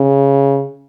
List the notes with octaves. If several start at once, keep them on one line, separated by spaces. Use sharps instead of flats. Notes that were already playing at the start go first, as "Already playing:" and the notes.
Already playing: C#3